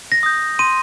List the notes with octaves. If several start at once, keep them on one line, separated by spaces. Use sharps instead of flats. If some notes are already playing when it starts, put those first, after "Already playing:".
A#6
D#6 G6
C6 D#7